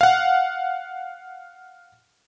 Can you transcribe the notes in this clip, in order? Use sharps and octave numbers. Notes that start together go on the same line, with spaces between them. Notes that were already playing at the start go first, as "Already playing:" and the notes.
F5 F#5